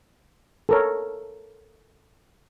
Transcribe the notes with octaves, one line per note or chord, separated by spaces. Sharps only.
A4 A#4 C#5